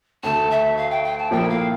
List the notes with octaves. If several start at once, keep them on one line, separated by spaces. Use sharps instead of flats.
D2 D3 A3 A5
E5
F5
G5
G5
A5
A#2 F3 A#3 E4 A4 G5
F5